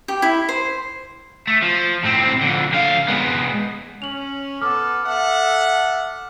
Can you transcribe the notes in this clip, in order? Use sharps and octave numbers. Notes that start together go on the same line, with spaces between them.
G4
E4
C5
A3
F3
A2 C4
F2 D3
D3 F5
G#3 B3
C#4 F7 F#7
B3 A4 D6 F6
A4 E5 F#5